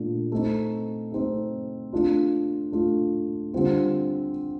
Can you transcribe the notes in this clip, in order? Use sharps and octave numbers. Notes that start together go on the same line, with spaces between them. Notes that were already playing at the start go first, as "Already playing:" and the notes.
Already playing: A#2 A3 D4
A3 C4 D#4
A3 C4 D#4
A3 D4 F4
A3 D4 F4
D3 G3 C4 F4